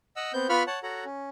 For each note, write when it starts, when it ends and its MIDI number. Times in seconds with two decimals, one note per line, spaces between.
0.16 0.32 75
0.16 0.32 78
0.16 0.32 88
0.34 0.47 59
0.34 0.47 60
0.34 0.47 91
0.49 0.63 59
0.49 0.63 65
0.49 0.63 71
0.49 0.63 83
0.49 0.63 85
0.49 0.63 89
0.67 0.79 73
0.67 0.79 78
0.67 0.79 81
0.83 1.04 66
0.83 1.04 69
0.83 1.04 73
0.83 1.04 78
0.83 1.04 82
1.05 1.30 61